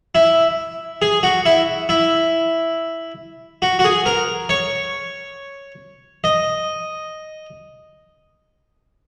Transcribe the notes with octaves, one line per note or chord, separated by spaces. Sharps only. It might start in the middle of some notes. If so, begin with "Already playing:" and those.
E4
G#4
F#4
E4
E4
F#4
F#4
G#4
A#4
C#5
D#5